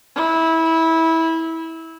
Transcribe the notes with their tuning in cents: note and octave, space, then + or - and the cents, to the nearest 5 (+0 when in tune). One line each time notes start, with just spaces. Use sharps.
E4 -20